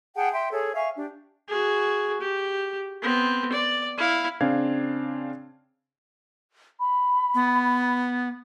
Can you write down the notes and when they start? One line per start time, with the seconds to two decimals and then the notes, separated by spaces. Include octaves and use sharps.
0.16 G#4 F#5 G5 A5
0.33 E5 G5 C6
0.51 G#4 A4 C#5
0.75 E5 F5 G#5 C#6
0.96 D4 G4
1.49 F#4 G#4
2.21 G4
3.02 B3 C4
3.53 D5
3.97 E4 F5
4.41 C#3 C4 D4 F5 G#6
6.80 B5
7.34 B3